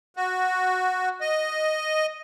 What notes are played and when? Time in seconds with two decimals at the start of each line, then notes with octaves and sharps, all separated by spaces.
0.16 F#4
1.21 D#5